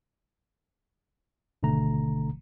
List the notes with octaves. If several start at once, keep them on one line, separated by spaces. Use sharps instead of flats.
G#1 B2 D3 A3 A#5